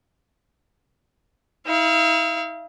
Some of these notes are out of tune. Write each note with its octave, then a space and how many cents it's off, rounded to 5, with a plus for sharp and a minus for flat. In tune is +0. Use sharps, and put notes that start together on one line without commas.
E4 -45 F5 -40